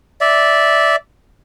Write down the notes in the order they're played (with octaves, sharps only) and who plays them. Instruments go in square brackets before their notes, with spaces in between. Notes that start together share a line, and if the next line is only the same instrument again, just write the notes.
[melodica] D5 E5